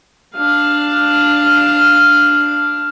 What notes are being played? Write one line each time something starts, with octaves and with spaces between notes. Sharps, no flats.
D4 F5